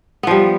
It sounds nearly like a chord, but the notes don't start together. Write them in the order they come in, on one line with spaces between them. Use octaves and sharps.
B3 F3 G3